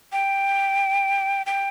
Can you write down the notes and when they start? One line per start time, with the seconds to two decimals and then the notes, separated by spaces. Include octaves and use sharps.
0.12 G5
1.46 G5